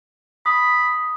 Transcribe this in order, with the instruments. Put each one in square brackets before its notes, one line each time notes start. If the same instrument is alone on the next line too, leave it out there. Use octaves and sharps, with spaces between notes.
[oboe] B5 [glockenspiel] D#6